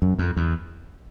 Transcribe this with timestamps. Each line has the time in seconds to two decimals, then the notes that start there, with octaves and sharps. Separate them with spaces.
0.02 F#2
0.19 F2
0.37 E2